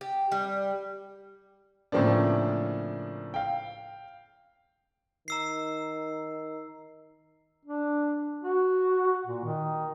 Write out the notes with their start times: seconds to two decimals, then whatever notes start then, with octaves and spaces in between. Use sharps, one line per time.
0.01 G4
0.32 G3
1.92 A2 C#3 F3 A#3 C4 D4
3.34 F5 G5
5.28 D#3 A#5 E6 C7
7.66 D4
8.43 F#4
9.27 A#2
9.45 D#3